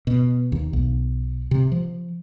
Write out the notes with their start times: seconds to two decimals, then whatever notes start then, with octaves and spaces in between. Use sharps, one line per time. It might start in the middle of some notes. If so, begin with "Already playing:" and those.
0.07 B2
0.52 D#2
0.73 B1
1.51 C3
1.72 F3